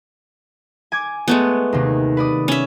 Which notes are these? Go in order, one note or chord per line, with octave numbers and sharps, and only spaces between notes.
G#5 D6 G#6
G#3 A3 B3
D#2 C3
B4 D5 D#6
C#4 E5